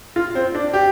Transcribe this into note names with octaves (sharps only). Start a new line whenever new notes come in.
F4
C4
D4
G4